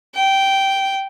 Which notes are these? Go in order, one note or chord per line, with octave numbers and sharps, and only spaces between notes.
G5